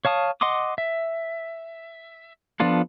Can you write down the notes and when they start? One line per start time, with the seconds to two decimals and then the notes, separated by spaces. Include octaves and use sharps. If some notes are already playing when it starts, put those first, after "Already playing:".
0.05 C#5 F5 A5 D#6
0.41 D#5 F#5 C6 D6 D#6
0.78 E5
2.60 F3 B3 D4 F4 A4